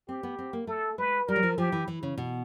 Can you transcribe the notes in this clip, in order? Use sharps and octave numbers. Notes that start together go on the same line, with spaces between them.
C4 G4
B3
C4
A#3
A3 A4
G#3 B4
G3 A#4
F#3
F3
F3 G4
E3
E3
C#3
B2